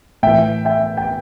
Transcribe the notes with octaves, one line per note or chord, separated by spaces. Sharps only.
A2 E3 E5 G5
E5 G5
G5